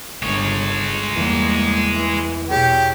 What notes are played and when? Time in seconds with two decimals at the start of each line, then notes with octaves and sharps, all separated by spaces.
0.23 G1 G#3 C#5
1.16 E2 G3 A#3
1.93 E3
2.50 B2 G4 G#4 C#5 C#7